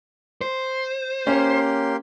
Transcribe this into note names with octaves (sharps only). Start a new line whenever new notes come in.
C5
A#3 C#4 G4 C6